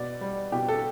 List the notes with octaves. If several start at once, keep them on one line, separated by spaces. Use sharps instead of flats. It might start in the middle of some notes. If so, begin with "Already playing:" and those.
Already playing: B2 D5
G3
B2 G4
A4